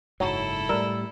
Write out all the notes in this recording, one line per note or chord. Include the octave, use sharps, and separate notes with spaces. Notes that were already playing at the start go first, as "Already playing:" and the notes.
F#1 G#2 F#3 E4 A4
A2 G3 A#4 D5 E6